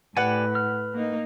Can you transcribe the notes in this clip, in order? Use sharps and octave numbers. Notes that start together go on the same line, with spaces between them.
A2 G4 B4 D5 F#5 G#5
F6
A#3 D#4